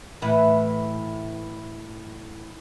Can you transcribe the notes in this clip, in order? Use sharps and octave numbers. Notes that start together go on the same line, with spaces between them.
A2 E3 B4